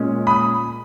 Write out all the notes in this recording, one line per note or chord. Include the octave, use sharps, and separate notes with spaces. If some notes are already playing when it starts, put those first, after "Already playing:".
Already playing: A#2 G#3 C#4
B5 D#6